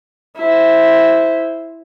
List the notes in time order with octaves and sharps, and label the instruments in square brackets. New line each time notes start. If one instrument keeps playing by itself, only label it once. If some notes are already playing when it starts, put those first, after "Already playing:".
[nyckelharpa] E4 C5